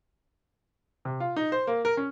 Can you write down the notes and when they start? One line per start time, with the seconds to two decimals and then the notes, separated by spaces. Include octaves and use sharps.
1.05 C3
1.20 F4
1.36 D#4
1.52 C5
1.67 A#3
1.85 A#4
1.97 C#4